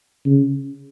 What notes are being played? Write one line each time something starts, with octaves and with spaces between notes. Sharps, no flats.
C#3